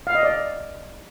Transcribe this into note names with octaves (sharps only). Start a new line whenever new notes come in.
F5
D#5
D5